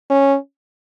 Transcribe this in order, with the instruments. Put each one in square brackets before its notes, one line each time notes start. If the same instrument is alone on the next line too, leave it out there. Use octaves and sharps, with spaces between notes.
[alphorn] C#4